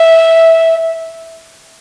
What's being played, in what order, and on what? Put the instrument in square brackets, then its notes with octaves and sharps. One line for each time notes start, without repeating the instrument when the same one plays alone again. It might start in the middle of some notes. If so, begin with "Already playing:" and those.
Already playing: [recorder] E5